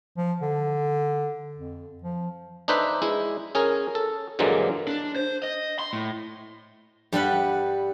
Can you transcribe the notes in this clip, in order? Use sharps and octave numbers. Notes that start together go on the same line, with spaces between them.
F3
D3
F2
F3
D4 D#4 B4 C5 E5
G#3 E4
C#4 G#4 A#4
A4
G2 D3 E3 F#3 G#3 A#3
D4
C5
D#5
C6
A2
G2 G3 B4 F#5